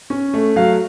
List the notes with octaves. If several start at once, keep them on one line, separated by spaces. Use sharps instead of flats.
C#4
A3
F#3 F5